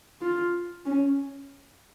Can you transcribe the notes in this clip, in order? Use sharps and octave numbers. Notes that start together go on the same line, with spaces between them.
F4
C#4